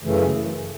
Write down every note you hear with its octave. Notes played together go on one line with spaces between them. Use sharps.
F#2 C#3 E3 A3